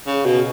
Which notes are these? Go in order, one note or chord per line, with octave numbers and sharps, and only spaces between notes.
C#3
B2